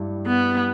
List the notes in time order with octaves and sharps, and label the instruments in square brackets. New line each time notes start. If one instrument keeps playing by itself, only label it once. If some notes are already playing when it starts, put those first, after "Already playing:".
Already playing: [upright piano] G2 G3 E4
[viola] B3